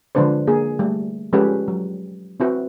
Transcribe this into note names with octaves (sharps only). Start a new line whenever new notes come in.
D3 F3 G#3 D4 B4 C5
A#3 G#4
G3 A3
F3 G#3 C#4 G4 A4 B4
F#3
C4 E4 F#4 B4